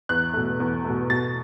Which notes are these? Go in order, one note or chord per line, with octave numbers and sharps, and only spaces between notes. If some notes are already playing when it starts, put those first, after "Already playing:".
E2 F#6
B2 A3
E2
B2 A3
B2 A6